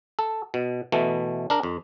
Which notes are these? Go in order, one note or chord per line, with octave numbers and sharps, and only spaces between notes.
A4
B2
B2 E3 A3
D4 A#4
F2